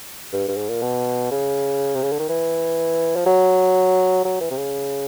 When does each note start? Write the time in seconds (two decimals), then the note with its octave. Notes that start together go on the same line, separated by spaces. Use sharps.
0.33 G2
0.48 G2
0.57 G#2
0.69 A#2
0.82 B2
1.31 C#3
1.95 C3
2.03 C#3
2.12 D3
2.19 D#3
2.29 E3
3.16 F3
3.26 F#3
4.25 F#3
4.40 E3
4.51 C3
4.57 C#3